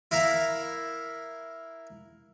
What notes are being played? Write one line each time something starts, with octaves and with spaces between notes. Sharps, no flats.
E4 A#4 E5 F5